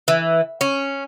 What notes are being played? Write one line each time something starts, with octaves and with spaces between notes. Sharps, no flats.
E3
C#4